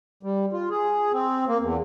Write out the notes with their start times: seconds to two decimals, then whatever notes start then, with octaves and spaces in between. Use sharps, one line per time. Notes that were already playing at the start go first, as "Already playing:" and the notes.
0.23 G3
0.53 F4
0.70 G#4
1.13 C4
1.48 A#3
1.60 E2